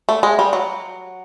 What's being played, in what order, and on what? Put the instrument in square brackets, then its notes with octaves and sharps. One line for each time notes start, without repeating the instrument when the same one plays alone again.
[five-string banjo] A3
G#3
G3
F#3